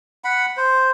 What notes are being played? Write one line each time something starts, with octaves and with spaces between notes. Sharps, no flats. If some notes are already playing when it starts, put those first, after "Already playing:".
F#5 B5
C5